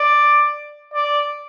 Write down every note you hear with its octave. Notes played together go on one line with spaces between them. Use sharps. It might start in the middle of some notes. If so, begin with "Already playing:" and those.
Already playing: D5
D5